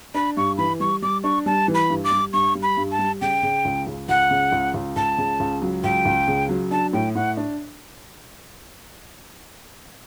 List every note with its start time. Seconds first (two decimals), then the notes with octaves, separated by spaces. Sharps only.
0.14 D4 B5
0.37 G2 C#6
0.58 E3 B5
0.80 G3 C#6
1.02 G3 D6
1.24 D4 C#6
1.46 G3 A5
1.68 E3
1.74 B5
1.90 G2
2.04 D6
2.12 G3
2.33 G2 C#6
2.55 G3
2.63 B5
2.77 G2
2.92 A5
2.99 G3
3.21 C#3 G5
3.43 C#3
3.65 C#2
3.87 C#2
4.09 C#2 F#5
4.31 C#3
4.52 C#2
4.74 C#2
4.96 C#2 A5
5.18 C#3
5.40 C#2
5.62 F#3
5.84 C#2 G5
6.05 C#2
6.28 C#3
6.49 F#3
6.71 D4 A5
6.93 A2 G5
7.15 A2 F#5
7.37 D4